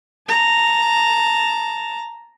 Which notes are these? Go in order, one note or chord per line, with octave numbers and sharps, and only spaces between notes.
A5 A#5